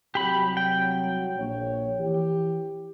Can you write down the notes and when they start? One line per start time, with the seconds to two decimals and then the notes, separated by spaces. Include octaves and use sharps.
0.15 C2 F#3 G4 B5
0.57 G5
1.36 A#1 C#5
1.99 E3 G4